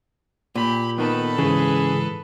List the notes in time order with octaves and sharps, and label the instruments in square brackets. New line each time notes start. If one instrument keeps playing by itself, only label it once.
[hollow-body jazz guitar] A#2 [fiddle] G4 B5
[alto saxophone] D#3 [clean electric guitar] B3 [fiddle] A4 B4
[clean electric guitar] G#2 E3 [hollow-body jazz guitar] C#3 [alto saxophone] G#4